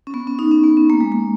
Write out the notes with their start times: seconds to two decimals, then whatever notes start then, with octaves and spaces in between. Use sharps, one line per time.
0.07 C#4
0.14 B3
0.27 C#4
0.39 D#4
0.51 C#4
0.64 B3
0.77 C#4
0.90 A#3
1.00 G#3
1.12 A#3